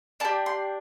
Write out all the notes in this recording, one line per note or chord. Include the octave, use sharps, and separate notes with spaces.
D4 G4 A5
C6